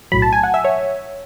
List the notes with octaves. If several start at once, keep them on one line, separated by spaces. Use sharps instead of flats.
B1 A2 F#3 B5
A5
G#5
F#5
E5
C#5